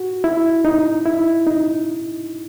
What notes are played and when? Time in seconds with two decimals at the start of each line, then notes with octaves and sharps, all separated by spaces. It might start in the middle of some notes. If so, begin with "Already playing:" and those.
Already playing: F#4
0.24 E4
0.65 D#4
1.06 E4
1.47 D#4